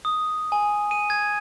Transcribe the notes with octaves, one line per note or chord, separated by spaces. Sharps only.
D#6
G#5
D#7
G#6